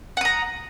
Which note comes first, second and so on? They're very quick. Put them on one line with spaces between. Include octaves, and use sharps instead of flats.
F#5 D#6 A#5